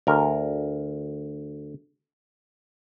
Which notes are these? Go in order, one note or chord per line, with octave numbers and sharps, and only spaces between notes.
D2 A#4